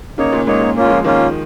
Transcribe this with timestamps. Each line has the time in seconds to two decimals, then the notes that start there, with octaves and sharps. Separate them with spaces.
0.18 C#3 A#3 D#4 C#5
0.32 A#2
0.47 G#2 A#3 D#4 C#5
0.61 A#2
0.76 A#3 C#4 F4
0.85 G#3
0.90 F3
1.04 D#3 A#3 C#4 F4